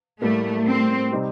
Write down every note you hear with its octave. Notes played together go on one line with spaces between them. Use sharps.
A2 G3 A3 A#3
C4
C3 G3 C4 D#4